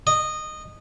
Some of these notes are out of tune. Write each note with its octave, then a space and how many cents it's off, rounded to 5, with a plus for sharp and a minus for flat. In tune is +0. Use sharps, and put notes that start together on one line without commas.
D#5 -15